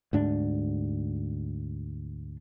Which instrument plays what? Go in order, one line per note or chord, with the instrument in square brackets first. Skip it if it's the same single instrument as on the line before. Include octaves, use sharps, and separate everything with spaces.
[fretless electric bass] D2 G#2 D4